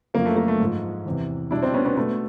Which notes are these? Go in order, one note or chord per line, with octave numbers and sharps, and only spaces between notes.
F#2 D3 F3 A#3
A3
A#3
A3
G#2 F3 G#3
E2 C3 E3
B2 G3 D4 E4
C4 D4
B3 C#4
B3 C#4
B2 G#3 A3 B3